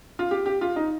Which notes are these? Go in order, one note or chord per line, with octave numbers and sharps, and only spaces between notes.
F4
G4
G4
F4
D#4